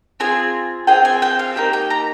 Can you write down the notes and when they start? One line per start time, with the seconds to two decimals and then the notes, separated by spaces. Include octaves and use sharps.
0.20 C4 F4 G#4 G#5
0.87 C4 F4 G#4 G5
1.05 G#5
1.22 G5
1.39 F5
1.56 A#3 D#4 G4 G5
1.73 G5
1.90 A#5